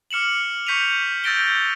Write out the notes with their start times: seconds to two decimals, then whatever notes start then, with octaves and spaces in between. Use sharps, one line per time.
0.11 D6 F6 C#7 E7 F#7
0.67 C#6 G6 B6 C#7 D#7 F7
1.24 E6 G6 A6 A#6 D7 G7